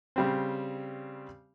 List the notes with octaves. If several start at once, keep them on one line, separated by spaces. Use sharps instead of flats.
C#3 G3 C4